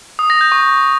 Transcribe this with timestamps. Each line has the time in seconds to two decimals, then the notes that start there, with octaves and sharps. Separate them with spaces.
0.19 D#6
0.30 A#6
0.41 G6
0.52 C#6